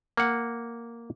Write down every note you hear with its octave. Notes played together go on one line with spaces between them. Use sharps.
A#3 F#5